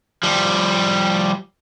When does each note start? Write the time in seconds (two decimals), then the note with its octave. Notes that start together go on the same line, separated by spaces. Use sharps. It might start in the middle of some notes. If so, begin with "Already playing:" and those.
0.23 F3 G3